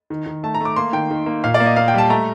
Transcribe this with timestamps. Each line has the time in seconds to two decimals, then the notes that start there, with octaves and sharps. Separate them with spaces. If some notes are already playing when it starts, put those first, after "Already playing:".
0.10 D#3
0.26 D#3
0.43 A3 A5
0.55 A#5
0.60 A3 D6
0.76 A#3 C6
0.93 D#3 G5
1.10 D#3
1.26 A#3
1.44 A#2 F5
1.54 D5
1.60 A#3
1.66 D#5
1.76 A#3 F5
1.88 G5
1.94 G3 A5
2.10 A3 A#5